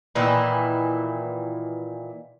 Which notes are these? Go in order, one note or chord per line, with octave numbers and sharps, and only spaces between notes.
A#2 D#3 E3 E4